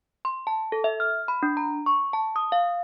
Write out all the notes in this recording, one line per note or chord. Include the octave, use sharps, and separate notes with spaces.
C6
A5
A4
E5
F6
B5
D4
A#5
C#6
A5
D#6
F5